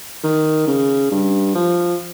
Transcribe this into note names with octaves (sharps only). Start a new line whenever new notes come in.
D#3
C#3
G2
F3